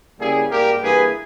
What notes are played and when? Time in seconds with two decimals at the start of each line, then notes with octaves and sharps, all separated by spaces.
0.20 C#3 G3 A#3 E4 G#4
0.51 G#2 G3 A#3 G4 A#4
0.81 G2 E3 A#3 G#4 B4